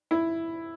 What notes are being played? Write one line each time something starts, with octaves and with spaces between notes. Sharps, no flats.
E4